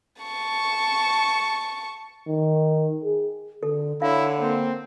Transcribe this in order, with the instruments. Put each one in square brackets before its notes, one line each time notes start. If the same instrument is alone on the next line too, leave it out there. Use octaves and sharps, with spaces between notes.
[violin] A5 C#6
[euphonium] D#3
G#4
[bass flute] D3 [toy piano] A4
[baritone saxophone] D3 [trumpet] E4 [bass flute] C#5 [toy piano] F5
[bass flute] A#3 [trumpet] C4